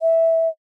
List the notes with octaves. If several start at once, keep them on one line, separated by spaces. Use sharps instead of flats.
E5